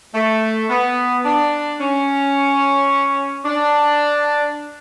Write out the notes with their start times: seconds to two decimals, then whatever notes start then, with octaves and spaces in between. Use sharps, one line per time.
0.14 A3
0.70 B3
1.25 D4
1.81 C#4
3.45 D4